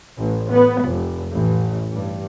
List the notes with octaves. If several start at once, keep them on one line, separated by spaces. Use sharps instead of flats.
A1
B3
F1
A1
G2